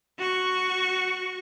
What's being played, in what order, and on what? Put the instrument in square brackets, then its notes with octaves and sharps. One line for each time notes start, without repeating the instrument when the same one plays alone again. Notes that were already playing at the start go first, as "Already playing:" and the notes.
[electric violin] F#4 C#6